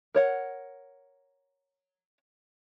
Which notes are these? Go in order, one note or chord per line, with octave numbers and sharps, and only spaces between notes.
A#4 C#5 F#5